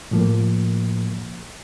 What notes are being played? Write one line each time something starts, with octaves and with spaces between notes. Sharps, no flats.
A2 F3 A#3